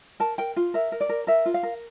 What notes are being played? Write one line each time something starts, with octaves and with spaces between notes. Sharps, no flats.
A#4 A5
A#4 G5
F4
A#4 E5
A#4
D5
A#4
A#4 E5
F4
F5
A#4